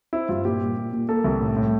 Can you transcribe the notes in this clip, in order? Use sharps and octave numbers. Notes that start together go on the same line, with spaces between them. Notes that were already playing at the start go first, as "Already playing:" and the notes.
C4 E4
G2 F4
A#2 G4
A#2
A#2
A#2
A#3 A4
C2
A2
A2